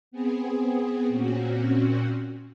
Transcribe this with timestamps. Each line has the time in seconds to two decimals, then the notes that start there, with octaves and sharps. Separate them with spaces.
0.11 B3 C4 G#4
1.08 A#2 C4 C#4 F#4